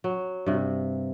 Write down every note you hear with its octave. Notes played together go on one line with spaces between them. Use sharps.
F#3
G2 C3